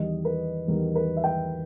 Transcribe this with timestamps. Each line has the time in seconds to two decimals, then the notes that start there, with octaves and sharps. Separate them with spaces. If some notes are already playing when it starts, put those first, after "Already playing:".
Already playing: E2 D#3 G3 D#5
0.25 B4
0.68 E2 D#3 G3 A#4
0.95 B4
1.17 E5
1.24 G5